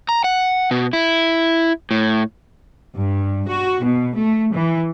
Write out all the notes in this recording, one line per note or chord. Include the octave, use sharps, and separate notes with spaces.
A#5
F#5
B2
E4
A2
G2
F#4
B2
A3
E3